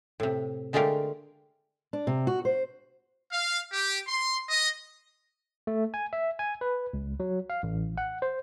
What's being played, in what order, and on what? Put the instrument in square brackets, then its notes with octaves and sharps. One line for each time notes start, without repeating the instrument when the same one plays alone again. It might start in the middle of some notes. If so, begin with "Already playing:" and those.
[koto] A2 C3
D3 G#3 A3 F4 G4 A#4
[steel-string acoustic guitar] D4
C3
F#4
C5
[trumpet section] F5
G4
C6
D#5
[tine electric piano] A3
G#5
E5
G#5
B4
C#2
F#3
F5
A1
F#5
C5